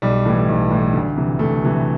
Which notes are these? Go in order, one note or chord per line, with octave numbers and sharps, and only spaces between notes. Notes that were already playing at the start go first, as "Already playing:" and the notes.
B1 G3
A2 E3
B1
A2 E3
D2
C3 E3
D2 A3
C3 E3